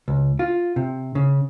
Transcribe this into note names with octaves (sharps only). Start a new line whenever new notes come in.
C#2
F4
C3
C#3